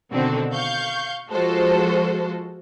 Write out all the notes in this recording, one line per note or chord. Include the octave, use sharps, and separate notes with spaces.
B2 D3 D#3 C4 F#4 A4
F5 C#6 G6
F3 G#3 F4 F#4 A4 C5